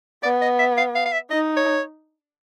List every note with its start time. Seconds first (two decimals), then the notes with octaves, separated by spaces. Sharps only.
0.23 B3 D5
0.42 D#5
0.59 E5
0.78 F5
0.96 F5
1.06 F5
1.13 E5
1.31 D#4 D#5
1.57 C#5